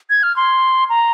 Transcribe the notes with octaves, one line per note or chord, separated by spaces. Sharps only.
G#6
F6
C6
A#5